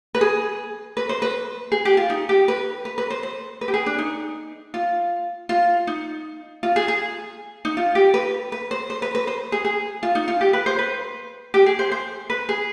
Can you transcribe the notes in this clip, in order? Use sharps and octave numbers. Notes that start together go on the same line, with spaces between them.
B4
G#4
B4
C5
B4
G#4
G4
F4
D#4
G4
B4
B4
B4
C5
C5
B4
G4
G#4
D4
D#4
F4
F4
D#4
F4
G#4
G#4
D#4
F4
G4
B4
B4
C5
C5
B4
B4
C5
G#4
G#4
F4
D#4
F4
G4
B4
C5
B4
G4
G#4
C5
C5
B4
G#4